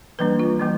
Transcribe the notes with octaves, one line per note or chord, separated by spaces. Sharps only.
E3 G3 A#3 D4 B4
F4
E3 G3 A#3